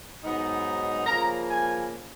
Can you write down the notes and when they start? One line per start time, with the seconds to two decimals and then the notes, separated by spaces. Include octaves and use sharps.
0.23 G#2 F#3 B3 D#4
1.07 C#3 F3 A#3 A#5
1.49 G#5